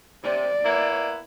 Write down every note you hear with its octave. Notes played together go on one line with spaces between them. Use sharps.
C3 D5
A#3 B3 E4